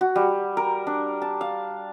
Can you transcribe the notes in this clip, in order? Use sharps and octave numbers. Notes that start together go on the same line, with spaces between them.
F#4
G3
A#4
D4
A5
F5